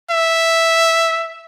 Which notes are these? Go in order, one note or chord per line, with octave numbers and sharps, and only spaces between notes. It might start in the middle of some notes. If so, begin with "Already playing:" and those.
E5